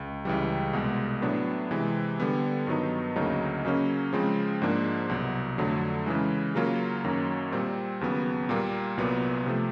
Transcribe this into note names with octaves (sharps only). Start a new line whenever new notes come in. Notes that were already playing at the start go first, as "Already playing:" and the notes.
Already playing: C#2
C#2 C#3 E3 G3
C2 B2 G#3
A2 F#3 B3 D4
C3 E3 G#3
D3 G3 B3
G2 D#3 F#3 B3 D#4
D2 C#3 F#3 A#3 D#4
C#3 F#3 A#3 C#4
C#3 F3 G#3 C4
G#2 F3 A#3 D4
C2 B2 F#3
F2 D3 F#3 A3
C#3 E3 G#3
C#3 F#3 A#3 C#4 F4
F#2 D#3 F#3 A#3 C#4
A#2 G3 C4
D#2 C#3 F#3 B3
A#2 G3 A#3
C2 A#2 F#3 B3
C3 F3 A3